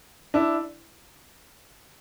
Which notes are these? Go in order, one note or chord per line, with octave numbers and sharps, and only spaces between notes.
D4 E4